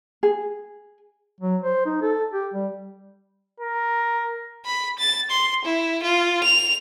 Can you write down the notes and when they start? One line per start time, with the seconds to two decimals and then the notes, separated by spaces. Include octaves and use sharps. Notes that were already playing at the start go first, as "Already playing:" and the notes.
0.23 G#4
1.40 F#3
1.62 C5
1.85 D#4
2.02 A4
2.32 G4
2.53 G3
3.60 A#4
4.65 B5
4.99 A6
5.30 C6
5.64 E4
6.03 F4
6.43 F7